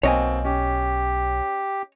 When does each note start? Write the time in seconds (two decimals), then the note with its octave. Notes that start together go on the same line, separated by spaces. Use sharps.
0.03 B1 B2 A#3 C4 C#5 D#5 G#5
0.45 C#4 G4